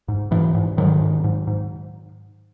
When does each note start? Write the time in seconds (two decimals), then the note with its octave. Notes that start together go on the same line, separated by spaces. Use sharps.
0.08 G#2
0.31 G#2 E3
0.54 G#2
0.77 G#2 D#3 F#3
1.01 G#2
1.24 G#2
1.47 G#2